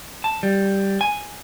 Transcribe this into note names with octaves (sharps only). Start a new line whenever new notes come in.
A5
G3
G#5